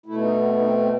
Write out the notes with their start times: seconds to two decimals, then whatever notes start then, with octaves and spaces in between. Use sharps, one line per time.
0.06 B2 A3 E4
0.21 D#4
0.36 B3
0.46 C4
0.50 B3
0.59 D#4
0.64 C4
0.78 C4